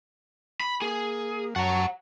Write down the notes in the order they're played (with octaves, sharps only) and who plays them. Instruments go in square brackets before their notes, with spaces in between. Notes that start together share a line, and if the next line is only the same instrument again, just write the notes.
[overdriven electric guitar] B5
[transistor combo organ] A#3 [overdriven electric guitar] G#4
[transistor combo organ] F#2 A5 C#6 [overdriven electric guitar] F#5 A#5